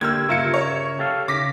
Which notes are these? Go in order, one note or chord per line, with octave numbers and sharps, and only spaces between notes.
D3 A#3 G4 E6 F6 G#6
G2 C#3 F4 A#4 E5 C#7
C#5
G4 A4 F5
C#3 D6 A#6 B6